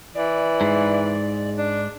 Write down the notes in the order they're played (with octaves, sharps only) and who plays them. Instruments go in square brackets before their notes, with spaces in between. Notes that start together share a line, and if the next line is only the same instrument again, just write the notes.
[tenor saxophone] E3 [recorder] D5
[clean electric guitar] G#2
[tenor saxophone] D4